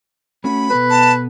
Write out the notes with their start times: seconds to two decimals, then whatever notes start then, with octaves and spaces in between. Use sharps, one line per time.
0.44 A3 C#4 F#4 B5
0.70 B2 B3 A4 B4
0.90 A5